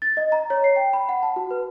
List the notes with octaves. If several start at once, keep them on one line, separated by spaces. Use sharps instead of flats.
A6
D#5
A#5
C#5
C7
G5
B5
F#5
A5
F#4
B4